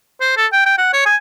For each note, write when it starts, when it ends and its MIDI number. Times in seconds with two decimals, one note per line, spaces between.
0.21 0.34 72
0.37 0.47 69
0.53 0.63 79
0.66 0.77 79
0.78 0.92 78
0.93 1.05 73
1.06 1.16 80